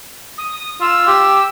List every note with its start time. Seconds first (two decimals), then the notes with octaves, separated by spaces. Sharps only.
0.37 D#6
0.81 F4 E6
1.07 G4